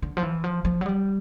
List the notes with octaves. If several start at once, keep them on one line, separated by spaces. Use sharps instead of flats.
D3
F3
E3
F3
F3
F#3
G3